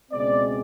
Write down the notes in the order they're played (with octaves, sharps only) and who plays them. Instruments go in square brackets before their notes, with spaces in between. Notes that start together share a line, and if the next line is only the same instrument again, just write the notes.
[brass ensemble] C#2 B2 G#3 C4 D5